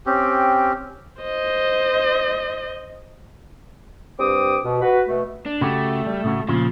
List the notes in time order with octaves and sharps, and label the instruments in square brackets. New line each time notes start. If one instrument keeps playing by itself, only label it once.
[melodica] C4 C#4 G4
[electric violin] C5 D#5
[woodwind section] G2 C4 D6 D#6
B2
F#4 B4
B2 A3
[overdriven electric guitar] D4
[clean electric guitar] C#3 F#4 G4 [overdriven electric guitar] A3
[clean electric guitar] G3
A2 C#3 F#4
[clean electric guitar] A#2 C#3 F4 [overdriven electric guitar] F3